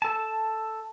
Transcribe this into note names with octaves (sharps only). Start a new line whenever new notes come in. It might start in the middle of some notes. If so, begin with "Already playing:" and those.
A4 A5